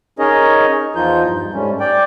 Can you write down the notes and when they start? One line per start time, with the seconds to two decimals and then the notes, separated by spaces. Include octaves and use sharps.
0.19 C#4 D#4 G#4 A#4 C#5 D#5
0.96 E2 F3 D#4 F4 G6
1.25 G2
1.54 G#2 G3 A3 C#4
1.80 D5 G5